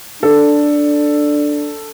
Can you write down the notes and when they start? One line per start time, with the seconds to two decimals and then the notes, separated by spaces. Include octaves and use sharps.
0.23 D4 A4